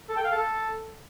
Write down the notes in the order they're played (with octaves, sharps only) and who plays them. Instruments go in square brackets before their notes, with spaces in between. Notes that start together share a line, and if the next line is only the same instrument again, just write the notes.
[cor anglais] A4
G5
F5
A4